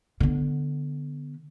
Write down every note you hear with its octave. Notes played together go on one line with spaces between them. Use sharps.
D3 B3